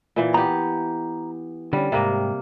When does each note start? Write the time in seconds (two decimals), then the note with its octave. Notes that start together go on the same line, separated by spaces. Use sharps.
0.16 A#2 E3
0.34 B3 G4 A#5
1.73 D3 G3 C#4
1.92 D2 G#2 C3 A#3